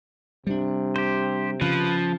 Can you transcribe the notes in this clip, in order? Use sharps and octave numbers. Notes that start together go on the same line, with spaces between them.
C3 G3 D4
G4 C5
C#3 F3 B4